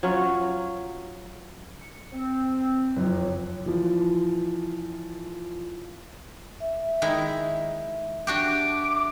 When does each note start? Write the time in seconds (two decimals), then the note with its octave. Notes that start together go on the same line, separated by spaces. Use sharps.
0.03 F#3 C#4 F4
1.81 C#7
2.13 C4
2.96 F#1 F2
3.66 E3 F3
6.60 E5
7.02 D#3 G#3 E4
8.27 D4 F#4 G4 D6